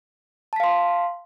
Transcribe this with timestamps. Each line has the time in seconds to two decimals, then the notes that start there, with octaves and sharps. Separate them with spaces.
0.53 A5
0.56 B6
0.60 F5
0.64 C6